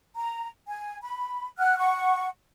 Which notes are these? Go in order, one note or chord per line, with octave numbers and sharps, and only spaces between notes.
A#5
G#5
B5
F#5 F6 F#6
F#5 C#6